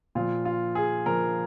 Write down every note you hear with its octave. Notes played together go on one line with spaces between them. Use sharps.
A#2 F3 F4
F4
G#4
A#2 F3 A#4